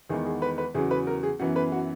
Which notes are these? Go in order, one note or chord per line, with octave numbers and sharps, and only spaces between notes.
E2 D#3 G#3 B3 G#4
G#4
B4
B4
E2 C#3 F#3 G#4
B4
A#4
G#4
F#2 E3 B3 F#4
B4
F#4